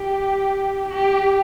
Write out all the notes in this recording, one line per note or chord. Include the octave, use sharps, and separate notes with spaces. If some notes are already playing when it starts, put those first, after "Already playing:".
Already playing: G4
G4